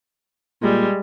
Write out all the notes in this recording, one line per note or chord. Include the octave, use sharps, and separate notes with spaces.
A#2 G3 G#3